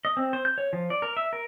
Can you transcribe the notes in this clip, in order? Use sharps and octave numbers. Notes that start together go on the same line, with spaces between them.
D#5
C4
C5
G6
C#5
F3
D5
A#4
E5
A#4